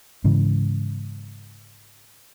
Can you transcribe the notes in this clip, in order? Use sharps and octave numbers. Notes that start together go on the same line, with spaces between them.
G#2 C#3 E3